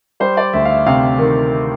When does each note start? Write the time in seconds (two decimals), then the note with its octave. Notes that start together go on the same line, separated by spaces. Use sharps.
0.20 G3 C5
0.37 D5
0.53 D2 E5
0.65 F5
0.70 E5
0.86 C3 F5
1.18 D#3